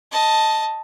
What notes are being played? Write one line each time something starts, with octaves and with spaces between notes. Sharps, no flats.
D#5 A5